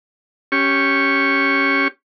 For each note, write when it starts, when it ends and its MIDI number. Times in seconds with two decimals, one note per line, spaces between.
0.52 1.88 61
0.52 1.88 67
0.52 1.88 85